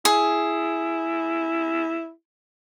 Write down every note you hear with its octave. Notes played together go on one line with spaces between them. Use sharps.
E4 G#4